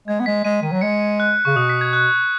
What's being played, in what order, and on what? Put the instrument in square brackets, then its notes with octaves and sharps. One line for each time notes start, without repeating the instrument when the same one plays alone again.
[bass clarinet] G#3 [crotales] G#6
[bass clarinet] B3
[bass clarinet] G#3 [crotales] B6
[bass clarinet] G#3 [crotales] D#7
[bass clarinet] D#3 [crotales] D#7
[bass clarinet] F#3
[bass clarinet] G#3 [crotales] C#7
[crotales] F#6
[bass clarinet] C#3 [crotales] C#6
[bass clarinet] B2 [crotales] D#6
[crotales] B6
G#6
F#6